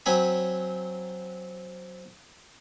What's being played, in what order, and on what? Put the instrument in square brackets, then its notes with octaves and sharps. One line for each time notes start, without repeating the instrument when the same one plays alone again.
[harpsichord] F#3 C4 C#5 G#5 B5